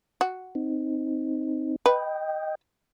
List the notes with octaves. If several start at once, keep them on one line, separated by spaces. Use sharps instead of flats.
F#4
C4 D#4
B4 D#5 G5